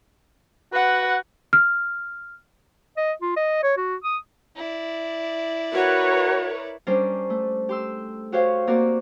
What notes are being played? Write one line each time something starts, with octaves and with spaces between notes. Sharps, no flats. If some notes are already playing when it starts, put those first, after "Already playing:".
F#4 B4 F#5
F6
D#5
F4
D#5
C#5
F#4
D#6
E4 D5
F#4 A#4 B4 C#5
G3 C#4 D4 A#4 C5 D5
A3
G4 C6 E6
F#4 G4 C5 C#5 F5
A#3 C4 F#4 A#4 D5